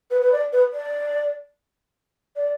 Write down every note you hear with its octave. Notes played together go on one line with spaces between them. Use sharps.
B4
B4
D5
B4
D5
D5